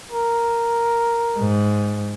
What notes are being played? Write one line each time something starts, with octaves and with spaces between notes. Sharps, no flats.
A#4
G#2